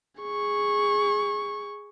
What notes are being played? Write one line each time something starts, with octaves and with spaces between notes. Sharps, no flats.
G#4 C#6